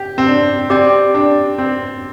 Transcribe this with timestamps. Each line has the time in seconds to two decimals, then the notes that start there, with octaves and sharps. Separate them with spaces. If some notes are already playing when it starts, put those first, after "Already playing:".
Already playing: G4
0.18 C4
0.27 D4
0.70 C4 G4 D5 G5
1.15 D4
1.58 C4